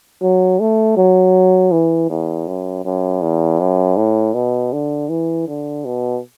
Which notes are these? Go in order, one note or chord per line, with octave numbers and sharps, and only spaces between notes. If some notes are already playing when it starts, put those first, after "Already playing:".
F#3
A3
F#3
E3
E2
F#2
F#2
E2
F#2
A2
B2
D3
E3
D3
B2